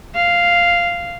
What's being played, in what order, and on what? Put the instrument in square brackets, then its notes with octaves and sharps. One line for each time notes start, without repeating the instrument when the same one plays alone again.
[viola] F5